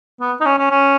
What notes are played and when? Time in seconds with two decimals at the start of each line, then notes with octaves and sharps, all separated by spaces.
0.21 B3
0.41 D#4
0.46 C#4
0.59 C#4
0.71 C#4